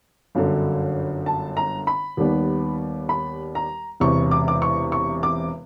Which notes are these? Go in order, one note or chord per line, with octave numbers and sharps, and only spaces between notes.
G1 F#2 D3
A5
A#5
B5
D#2 D#3 G3 B3
B5
A#5
E1 E2 C3 C#6
D6
D6
C#6
C#6
D6